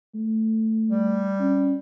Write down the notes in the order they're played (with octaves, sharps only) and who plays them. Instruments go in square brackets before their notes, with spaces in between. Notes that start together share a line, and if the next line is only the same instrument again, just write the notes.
[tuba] A3
[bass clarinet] G3
[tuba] C#4